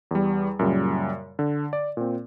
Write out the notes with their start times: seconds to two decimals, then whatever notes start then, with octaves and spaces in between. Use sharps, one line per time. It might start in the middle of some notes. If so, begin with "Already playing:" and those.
0.11 E2 G3
0.59 F#2 A#2 C#3 G3
1.39 D3
1.73 D5
1.97 A#2 C4